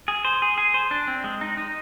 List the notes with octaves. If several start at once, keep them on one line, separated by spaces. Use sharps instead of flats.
G#4
C5
G#4
G#4
C5
D4
C4
G#3
D#4
D#4